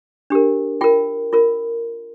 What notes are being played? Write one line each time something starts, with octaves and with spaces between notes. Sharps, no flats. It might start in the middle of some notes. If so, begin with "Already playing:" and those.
D4 G4 A#4
F4 A#4 G5
F4 A#4